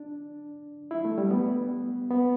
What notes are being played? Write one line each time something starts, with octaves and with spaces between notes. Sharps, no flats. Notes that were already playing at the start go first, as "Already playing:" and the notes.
Already playing: D4
E4
A3
G3
B3
B3